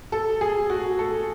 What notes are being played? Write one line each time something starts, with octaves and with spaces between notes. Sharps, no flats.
A4
G#4
F#4
A4